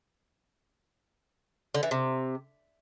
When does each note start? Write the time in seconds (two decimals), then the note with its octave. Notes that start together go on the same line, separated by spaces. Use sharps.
1.74 D3
1.83 E3
1.91 C3